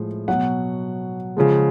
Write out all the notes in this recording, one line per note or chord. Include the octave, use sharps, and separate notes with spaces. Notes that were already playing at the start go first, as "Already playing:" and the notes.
Already playing: A2 F3 G#3
B2 F#3 F#5
C#3 F3 G#3